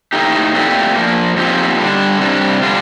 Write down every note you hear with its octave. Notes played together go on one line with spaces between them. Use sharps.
A2 A3 D#4 G4
A#2 A3 C4 G4
A#2 F3 A#3
A#2 F3 C4 D#4 G4
D3 G3 D4
C3 G3 D4
D3 G3 D4 F4